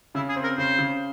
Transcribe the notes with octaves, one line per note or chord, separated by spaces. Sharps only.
C#3 E4
G#4
C4
A#4
C#3 C5
C#3